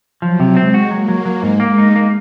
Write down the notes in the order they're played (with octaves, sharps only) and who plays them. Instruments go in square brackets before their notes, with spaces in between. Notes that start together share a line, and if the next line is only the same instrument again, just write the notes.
[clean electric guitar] F3 [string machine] F#3
[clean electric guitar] C3
[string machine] G#3 [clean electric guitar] C4
[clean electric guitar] F#4
[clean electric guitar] F#3 [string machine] A#3
[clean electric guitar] F#3
F#3
G#2
[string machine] G#3 [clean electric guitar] A#3
[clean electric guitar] D#4
A#3